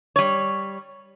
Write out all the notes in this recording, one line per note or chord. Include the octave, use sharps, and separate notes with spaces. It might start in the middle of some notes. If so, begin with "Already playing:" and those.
G3 C#5